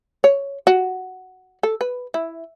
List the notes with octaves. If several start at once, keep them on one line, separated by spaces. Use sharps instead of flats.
C#5
F#4
A4
B4
E4